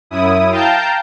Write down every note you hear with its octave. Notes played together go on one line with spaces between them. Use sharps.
F#2 E4 D#6
F5 G5 A5 A#5 G6